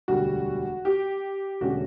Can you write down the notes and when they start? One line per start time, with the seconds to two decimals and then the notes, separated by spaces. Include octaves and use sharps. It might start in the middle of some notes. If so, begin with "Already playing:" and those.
0.08 E1 D2 D3 G3 F#4
0.85 G4
1.61 E1 D3 A3 C#4 F#4